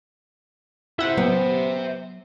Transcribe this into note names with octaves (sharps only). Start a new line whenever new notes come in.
E4 C5 E5 F#5
F#3 B3